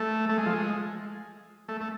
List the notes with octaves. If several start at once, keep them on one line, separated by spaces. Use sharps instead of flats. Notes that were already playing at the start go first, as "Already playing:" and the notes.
Already playing: A3
A3
G#3
F3
G#3
A3
A3